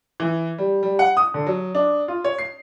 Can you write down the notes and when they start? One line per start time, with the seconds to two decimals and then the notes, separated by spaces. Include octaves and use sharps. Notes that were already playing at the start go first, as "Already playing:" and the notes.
0.20 E3
0.58 G3
0.83 G3
0.99 F#5
1.17 D#6
1.34 D3
1.46 F#3
1.75 D4
2.08 F4
2.25 C#5
2.38 C7